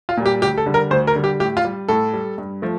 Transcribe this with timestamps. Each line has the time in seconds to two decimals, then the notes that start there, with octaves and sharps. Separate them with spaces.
0.09 F4
0.17 A#2 G3
0.26 G4
0.42 D2 G4
0.57 A4
0.66 D3 G3
0.74 A#4
0.90 D2 C5
1.07 A#4
1.15 D3 G3
1.24 G4
1.40 A2 G4
1.57 F4
1.65 G3
1.88 A2 A4
2.13 G3
2.38 G2
2.62 F3 A3